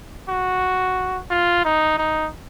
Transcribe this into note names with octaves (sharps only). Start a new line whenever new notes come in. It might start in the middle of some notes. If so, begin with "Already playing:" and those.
F#4
F4
D#4
D#4